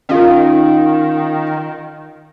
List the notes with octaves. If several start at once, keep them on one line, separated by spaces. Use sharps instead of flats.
D#3 C#4 F4